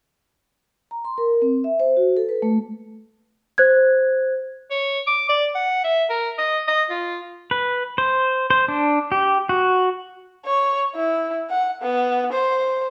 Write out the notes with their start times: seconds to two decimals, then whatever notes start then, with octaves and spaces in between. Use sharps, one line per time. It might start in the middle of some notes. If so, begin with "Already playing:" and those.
0.91 A#5
1.05 C6
1.18 A#4
1.42 C4
1.64 E5
1.80 C5
1.97 F#4
2.17 A4
2.29 B4
2.42 A3
3.58 C5 F#6 G#6
4.71 C#5
5.07 D6
5.29 D5
5.55 F#5
5.84 E5
6.10 A#4
6.38 D#5
6.68 D#5
6.90 F4
7.51 B4
7.98 C5
8.50 C5
8.68 D4
9.12 G4
9.49 F#4
10.45 C#5
10.95 E4
11.50 F#5
11.82 B3
12.33 C5